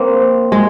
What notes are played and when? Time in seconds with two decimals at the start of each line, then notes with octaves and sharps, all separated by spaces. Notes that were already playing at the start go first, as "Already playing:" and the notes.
Already playing: A#3 C4
0.52 G#3